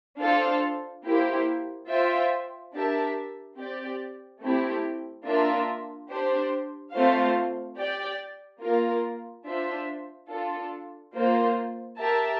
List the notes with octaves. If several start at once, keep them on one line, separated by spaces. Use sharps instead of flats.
D4 F4 A4 C5 F5
A#3 E4 G4 C5
F4 C5 E5 G5
D4 G4 A#4 E5 A5
C4 G4 D5
A3 C4 E4 G4
A#3 D4 F4 A#4 E5
D4 G4 C5
A3 C4 F4 C5 F5
G4 D5 G5
A#3 F4 A#4
D4 F4 C5 E5
D4 F4 A4
A#3 F4 C5
G4 A#4 E5 A5